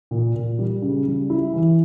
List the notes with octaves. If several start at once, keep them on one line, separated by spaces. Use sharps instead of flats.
A#2
A#2
G3
C#3
G3
E4
E3